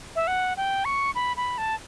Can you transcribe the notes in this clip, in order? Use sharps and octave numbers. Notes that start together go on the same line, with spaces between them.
E5
F#5
G5
C#6
B5
B5
A5